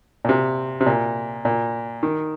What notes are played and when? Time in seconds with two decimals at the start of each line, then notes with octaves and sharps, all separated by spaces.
0.25 A#2
0.29 C3
0.81 C3
0.86 A#2
1.45 A#2
2.03 D#3